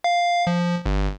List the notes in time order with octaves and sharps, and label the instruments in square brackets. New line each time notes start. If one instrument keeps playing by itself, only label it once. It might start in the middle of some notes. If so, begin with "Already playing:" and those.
[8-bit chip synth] F5
F3
G1